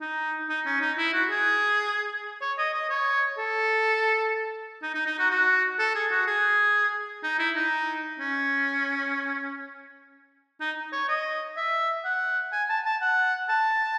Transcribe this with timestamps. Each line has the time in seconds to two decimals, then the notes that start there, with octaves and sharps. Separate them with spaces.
0.01 D#4
0.49 D#4
0.66 C#4
0.81 D#4
0.98 E4
1.13 F#4
1.30 G#4
2.42 C#5
2.58 D#5
2.74 D#5
2.89 C#5
3.38 A4
4.82 D#4
4.95 D#4
5.06 D#4
5.19 F#4
5.30 F#4
5.79 A4
5.95 G#4
6.11 F#4
6.27 G#4
7.23 D#4
7.39 E4
7.56 D#4
8.19 C#4
10.60 D#4
10.93 C#5
11.08 D#5
11.57 E5
12.05 F#5
12.52 G#5
12.69 A5
12.85 A5
13.01 F#5
13.49 A5